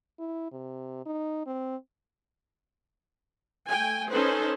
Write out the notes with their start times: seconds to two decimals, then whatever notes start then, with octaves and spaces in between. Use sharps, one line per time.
0.19 E4
0.52 C3
1.06 D#4
1.46 C4
3.67 A3 G5 G#5
4.09 C#4 D#4 A4 B4 C5